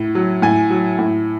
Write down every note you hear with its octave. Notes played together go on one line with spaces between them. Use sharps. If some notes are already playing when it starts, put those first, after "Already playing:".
Already playing: A2
F#3
A2 G#5
F#3
A2